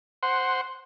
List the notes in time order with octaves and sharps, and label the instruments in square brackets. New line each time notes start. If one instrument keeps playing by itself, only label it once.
[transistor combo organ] C5 F#5 C6